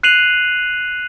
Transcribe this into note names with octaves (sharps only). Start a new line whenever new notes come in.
F#6 C7 D#7 F7 F#7